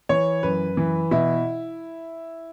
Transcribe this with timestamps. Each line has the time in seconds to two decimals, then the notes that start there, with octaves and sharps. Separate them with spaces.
0.09 E3 C#5
0.43 F#2 B4
0.77 E3
1.11 B2 E4